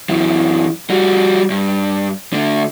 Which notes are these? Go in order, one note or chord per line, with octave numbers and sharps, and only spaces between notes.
F#2 E3
G3 F#4
G2
D3 A3